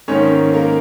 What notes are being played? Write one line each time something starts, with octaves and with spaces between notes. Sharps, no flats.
G#2 D#3 A#3 C#4 C#5
A#3 A#4